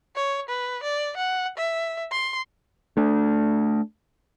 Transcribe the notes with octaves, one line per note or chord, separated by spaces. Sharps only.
C#5
B4
D5
F#5
E5
C6
A3 D4